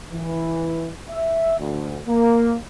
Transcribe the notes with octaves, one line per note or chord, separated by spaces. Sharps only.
E3
E5
D2
A#3